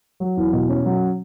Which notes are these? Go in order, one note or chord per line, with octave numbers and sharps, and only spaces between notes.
F#3
E2
B2
C#4
F#3